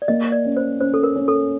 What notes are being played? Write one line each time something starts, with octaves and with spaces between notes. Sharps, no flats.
D5
A#3 D#5
D5
C#4
C5
C#4 C5
A4
A#4
C#4
A4